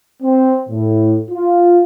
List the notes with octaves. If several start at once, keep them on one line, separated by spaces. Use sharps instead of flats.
C4
A2
F4